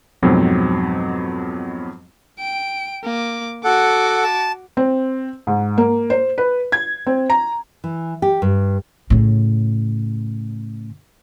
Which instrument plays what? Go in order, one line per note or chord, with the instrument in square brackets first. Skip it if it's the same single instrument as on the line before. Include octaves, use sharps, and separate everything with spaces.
[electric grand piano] F2 G#2 B2 F#3 C4
[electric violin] G5 D7
A#3 D6
[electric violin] F#4 D6 [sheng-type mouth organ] A4 F#5
[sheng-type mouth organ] A5
[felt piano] C4
G#2
A#3
C5
B4
G#6
C4
A#5
[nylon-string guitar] E3
G4
G2
[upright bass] A2 C#3